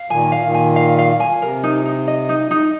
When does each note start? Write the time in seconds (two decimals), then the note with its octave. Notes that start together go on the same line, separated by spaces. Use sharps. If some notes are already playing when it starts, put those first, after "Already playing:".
Already playing: F5
0.10 A#2 D#3 G#5
0.32 F5
0.43 A#2 D#3
0.54 G#5
0.76 F5
0.99 F5
1.20 G#5
1.42 C3 A#4
1.64 D#4
1.85 D#4
2.08 D#5
2.29 D#4
2.51 D#4